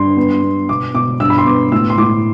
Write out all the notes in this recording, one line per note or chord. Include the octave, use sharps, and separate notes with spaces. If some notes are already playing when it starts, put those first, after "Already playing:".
Already playing: G2 C6
B3
B3
B2 D6
B2 D6
G2 E6
B5
C6
B3 D6
A2 E6
C6
A2 D6